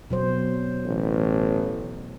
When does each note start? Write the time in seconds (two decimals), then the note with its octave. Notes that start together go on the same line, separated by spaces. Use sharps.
0.10 B2 F#3 C5
0.85 A1